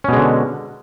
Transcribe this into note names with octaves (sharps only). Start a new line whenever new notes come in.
B2 D3 G#3 C#4